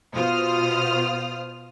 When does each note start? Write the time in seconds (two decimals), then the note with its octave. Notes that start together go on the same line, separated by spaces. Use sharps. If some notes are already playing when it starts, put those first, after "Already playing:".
0.14 B2 F4 C5 D#6 F6